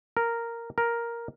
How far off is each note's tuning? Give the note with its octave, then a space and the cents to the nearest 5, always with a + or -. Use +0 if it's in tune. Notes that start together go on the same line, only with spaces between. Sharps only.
A#4 -5
A#4 +5